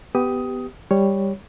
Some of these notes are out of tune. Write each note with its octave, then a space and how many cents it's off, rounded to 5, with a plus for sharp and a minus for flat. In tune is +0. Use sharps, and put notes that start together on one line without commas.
B3 +10 G4 +0 D#6 +15
G3 +10 C#5 +0